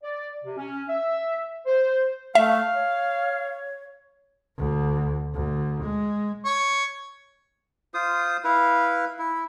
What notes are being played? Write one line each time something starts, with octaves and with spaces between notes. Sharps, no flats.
D5
C3
C#4
E5
C5
A3 E5 F5
C#5
D2
D2
G#3
C#5
F4 C5 D#6
E4 B4 F5
E4